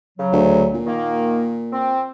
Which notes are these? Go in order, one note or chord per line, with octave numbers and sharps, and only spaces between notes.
C#3 F#3
D2
A#2
D#3 A#3
C4